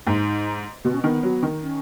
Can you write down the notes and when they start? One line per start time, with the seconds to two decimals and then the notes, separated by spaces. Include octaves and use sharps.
0.07 G#2 D#4
0.85 B2 B3
0.93 C#4
1.03 D#3 B3
1.23 F#3
1.43 D#3
1.62 C#4